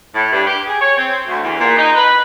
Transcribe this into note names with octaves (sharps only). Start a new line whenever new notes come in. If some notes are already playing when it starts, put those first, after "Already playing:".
A2
G2
G4
G#4
C#5
C4
D2
E2
A#2
D#4
B4